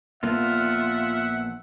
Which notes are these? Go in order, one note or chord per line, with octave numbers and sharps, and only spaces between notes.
A#1 A#3 B3 F4 E5 F#5